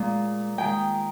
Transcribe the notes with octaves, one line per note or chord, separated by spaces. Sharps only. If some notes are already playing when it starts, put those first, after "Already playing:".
Already playing: A#2 G#3
D#3 G#3 G5